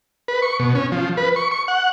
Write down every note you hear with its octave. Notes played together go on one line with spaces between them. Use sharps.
B4
C#6
B2
C#4
F3
B4
C#6
C#6
F#5